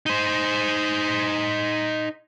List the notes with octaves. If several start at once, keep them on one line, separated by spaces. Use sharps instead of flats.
D#4 C5